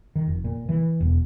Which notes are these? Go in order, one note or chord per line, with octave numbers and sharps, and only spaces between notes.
D#3
F1
A#2
E3
E1